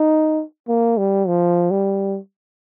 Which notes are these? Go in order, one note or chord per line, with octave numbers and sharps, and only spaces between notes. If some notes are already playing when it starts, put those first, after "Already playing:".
Already playing: D#4
A#3
G3
F3
G3